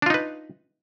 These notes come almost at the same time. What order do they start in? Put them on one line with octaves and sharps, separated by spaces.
D4 F4 D#4 B4